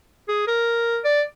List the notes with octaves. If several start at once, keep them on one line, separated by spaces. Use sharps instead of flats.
G#4
A#4
D5